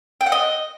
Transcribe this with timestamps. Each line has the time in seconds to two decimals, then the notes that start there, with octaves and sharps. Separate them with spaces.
0.21 G5
0.26 F#5
0.32 D#5